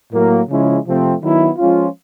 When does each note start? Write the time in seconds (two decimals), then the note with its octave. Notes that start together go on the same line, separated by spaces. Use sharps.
0.12 A2 F#3 A#3
0.48 C#3 F3 G#3 C#4 E4
0.85 C3 F3 A3 C4
1.21 D#3 F#3 B3 E4
1.57 F3 G#3 C#4 F4